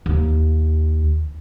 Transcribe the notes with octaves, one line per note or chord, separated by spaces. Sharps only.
D#2